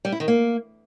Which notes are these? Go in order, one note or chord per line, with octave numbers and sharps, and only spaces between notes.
G3
E4
D#3
A#3